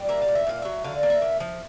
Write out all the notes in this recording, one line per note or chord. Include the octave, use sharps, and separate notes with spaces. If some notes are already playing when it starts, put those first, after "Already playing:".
Already playing: G3
A#3 E5
F5
A#2
E5
A#2 F5
F#3 E5
D3 F5
A#3
E5
A#3
F3